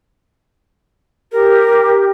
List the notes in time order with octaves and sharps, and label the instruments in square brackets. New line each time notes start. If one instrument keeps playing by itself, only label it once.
[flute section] G4 [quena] A#4